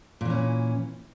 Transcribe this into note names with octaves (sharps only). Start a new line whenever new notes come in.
A#2 E3 C#4